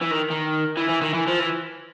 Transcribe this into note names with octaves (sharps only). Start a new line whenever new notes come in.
E3
D#3
D#3
E3
E3
D#3
E3
F3
E3